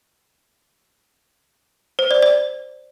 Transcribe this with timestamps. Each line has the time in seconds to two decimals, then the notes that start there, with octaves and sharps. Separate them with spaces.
1.99 C5
2.11 D5
2.23 D5